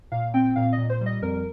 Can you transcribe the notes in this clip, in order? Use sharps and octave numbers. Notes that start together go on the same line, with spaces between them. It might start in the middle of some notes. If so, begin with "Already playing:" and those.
A#2 F5
C4 G5
A#2 F5
A#2 D#5
C5
G3
D#5
F2 A#4